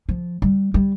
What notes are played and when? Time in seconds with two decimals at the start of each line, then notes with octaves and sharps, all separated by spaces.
0.09 F3
0.42 G3
0.74 G3